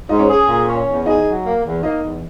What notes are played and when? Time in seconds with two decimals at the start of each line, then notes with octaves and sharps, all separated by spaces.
0.09 G#2 D#4 D#5
0.19 C#4 C#5
0.29 G#4
0.48 A#2
0.68 C#4
0.87 E2
1.06 D#4 G#4 D#5
1.25 F#3
1.45 A#3
1.64 E2
1.83 A#3 D#4 D#5
2.02 E2